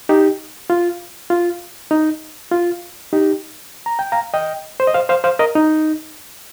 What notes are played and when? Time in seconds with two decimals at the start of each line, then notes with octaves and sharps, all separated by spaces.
0.09 D#4 G4
0.70 F4
1.30 F4
1.91 D#4
2.51 F4
3.13 D#4 G4
3.86 A#5
3.99 G5
4.12 F5 A#5
4.34 D#5 G5
4.80 C5
4.87 D#5
4.94 C5 F5
5.09 C5 F5
5.24 C5 F5
5.39 A#4 D#5
5.55 D#4